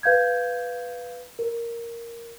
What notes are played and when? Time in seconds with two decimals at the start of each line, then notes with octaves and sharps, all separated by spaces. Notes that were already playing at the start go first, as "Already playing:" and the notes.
0.03 B4 F5 G6 G#6
1.39 A#4